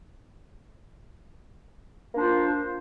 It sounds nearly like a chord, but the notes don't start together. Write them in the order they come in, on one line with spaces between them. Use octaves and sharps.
A#3 D4 C5 F4